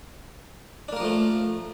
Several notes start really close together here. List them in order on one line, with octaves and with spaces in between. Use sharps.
D4 A#3 A#4 F3 A3